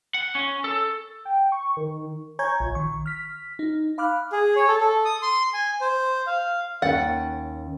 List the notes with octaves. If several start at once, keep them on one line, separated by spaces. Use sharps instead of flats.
F#5
C#4
A4
G5
C#6
D#3
C#5 G#5 A#5 C#6 G6 G#6
A#1
D#3 C#6
F6 B6
D#4
F5 B5 D6 F6 F#6
G#4
C#5
A4
A4
D#6
C6
G#5
C5
F5
D#2 C#4 F#5 G5 A6